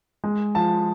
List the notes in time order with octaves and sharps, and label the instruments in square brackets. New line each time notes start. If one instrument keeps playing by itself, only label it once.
[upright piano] G#3
F3 A5